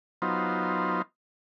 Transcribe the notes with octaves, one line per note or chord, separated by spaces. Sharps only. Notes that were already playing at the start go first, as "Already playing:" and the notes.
F#3 B3 D#4 F4 C5